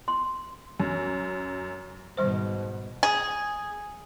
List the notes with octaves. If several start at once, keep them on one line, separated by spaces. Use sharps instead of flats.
C6
F#2
G#2 B2 D#3 G3 C5
G#4